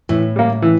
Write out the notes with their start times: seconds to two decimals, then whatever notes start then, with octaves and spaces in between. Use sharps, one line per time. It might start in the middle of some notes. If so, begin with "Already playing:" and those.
0.09 A2 E3
0.36 G3 A#3
0.62 E3